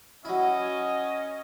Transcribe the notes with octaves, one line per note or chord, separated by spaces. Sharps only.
F#3 C#4 E4 D#5